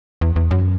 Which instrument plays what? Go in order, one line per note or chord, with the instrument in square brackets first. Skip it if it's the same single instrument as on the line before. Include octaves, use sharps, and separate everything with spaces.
[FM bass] E2
E2
F#2